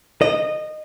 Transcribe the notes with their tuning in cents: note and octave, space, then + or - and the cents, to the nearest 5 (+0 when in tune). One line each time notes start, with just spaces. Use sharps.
D#5 -20